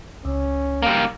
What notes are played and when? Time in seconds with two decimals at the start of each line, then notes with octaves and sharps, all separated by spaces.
0.25 C#2 C#4
0.82 G3 A#3